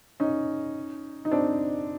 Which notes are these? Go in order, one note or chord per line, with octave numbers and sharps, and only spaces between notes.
C#4 D#4
D#4
C4 D4